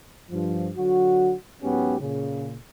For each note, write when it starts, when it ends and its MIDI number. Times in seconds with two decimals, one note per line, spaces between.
0.31 0.69 43
0.31 0.69 53
0.76 1.33 50
0.76 1.33 54
0.76 1.33 66
1.63 1.98 44
1.63 1.98 54
1.63 1.98 59
1.63 1.98 61
1.63 1.98 67
2.00 2.55 46
2.00 2.55 49